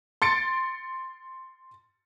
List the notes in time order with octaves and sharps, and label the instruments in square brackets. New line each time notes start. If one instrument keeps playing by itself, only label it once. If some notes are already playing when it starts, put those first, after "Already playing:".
[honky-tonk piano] C6 A6 C#7 D7